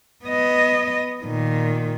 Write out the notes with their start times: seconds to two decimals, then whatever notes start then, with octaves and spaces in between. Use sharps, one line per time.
0.25 B3 D#5
1.24 A#2 D#3